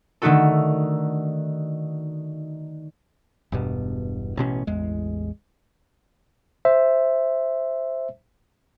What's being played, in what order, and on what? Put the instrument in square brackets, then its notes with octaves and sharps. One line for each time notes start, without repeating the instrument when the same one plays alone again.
[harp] D3 D#3 A3 D#4 F#4 A4
[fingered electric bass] E1 G2 B2
A1 B2 C#4
A1 E2 G#3
[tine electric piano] C5 E5